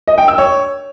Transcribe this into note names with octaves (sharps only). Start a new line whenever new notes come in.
D#5
G5
E6
C#5